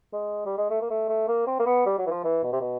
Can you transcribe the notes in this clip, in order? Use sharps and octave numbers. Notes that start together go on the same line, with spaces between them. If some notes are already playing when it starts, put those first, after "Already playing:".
G#3
G3
G#3
A3
A#3
A3
A3
A#3
C4
A#3
B3
G3
F#3
E3
F3
E3
B2
C3
B2